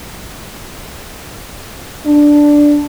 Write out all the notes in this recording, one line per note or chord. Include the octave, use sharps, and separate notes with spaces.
D4